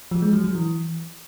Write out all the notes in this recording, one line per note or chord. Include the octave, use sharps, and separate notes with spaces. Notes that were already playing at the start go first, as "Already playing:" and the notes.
F3
G#3
F#3
F#3
E3